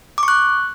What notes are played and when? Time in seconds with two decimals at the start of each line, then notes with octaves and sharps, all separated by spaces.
0.18 D6
0.23 C#6
0.28 F#6